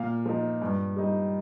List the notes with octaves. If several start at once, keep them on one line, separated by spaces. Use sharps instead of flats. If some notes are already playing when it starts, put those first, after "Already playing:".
Already playing: A#2 F5
F3 D#4
G2
G3 D#4